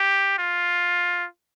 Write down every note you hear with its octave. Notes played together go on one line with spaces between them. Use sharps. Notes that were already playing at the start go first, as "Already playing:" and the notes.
Already playing: G4
F4